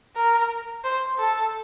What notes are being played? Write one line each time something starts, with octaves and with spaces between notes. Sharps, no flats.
A#4
C5
A4